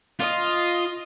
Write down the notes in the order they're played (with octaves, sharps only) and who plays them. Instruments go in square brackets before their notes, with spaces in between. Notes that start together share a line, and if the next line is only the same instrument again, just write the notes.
[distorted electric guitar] F4 [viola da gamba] D#5